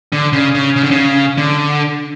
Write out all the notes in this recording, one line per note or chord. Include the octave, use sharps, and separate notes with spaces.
D3
C#3
C#3
C#3
D3
C#3
D3